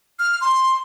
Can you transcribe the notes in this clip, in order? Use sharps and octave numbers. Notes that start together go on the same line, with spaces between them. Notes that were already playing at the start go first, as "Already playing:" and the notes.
F6
C6